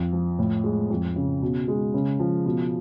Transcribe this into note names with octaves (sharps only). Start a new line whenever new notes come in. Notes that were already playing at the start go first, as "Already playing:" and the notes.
Already playing: F2
F3
A2
G#3
F2
C#3
B2
G#3
C#3
F3
B2